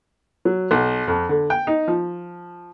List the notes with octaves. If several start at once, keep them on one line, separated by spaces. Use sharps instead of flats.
F#3
B1
F2
D3
G5
D#4
F3